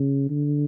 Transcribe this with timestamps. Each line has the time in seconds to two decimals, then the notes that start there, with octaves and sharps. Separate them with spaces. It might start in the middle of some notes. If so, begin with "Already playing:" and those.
Already playing: C#3
0.30 D3